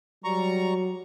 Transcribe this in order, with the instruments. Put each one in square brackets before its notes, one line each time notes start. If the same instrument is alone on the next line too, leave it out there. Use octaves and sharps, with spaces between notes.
[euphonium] F#3 [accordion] G3 A#5 C#6